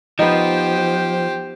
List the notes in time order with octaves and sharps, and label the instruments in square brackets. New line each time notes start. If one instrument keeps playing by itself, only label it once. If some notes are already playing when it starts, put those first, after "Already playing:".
[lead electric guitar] F3 [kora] B3 D#4 [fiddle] G4 C5